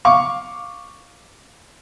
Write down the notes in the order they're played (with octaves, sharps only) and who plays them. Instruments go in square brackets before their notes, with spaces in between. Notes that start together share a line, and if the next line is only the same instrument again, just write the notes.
[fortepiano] F5 C#6 D6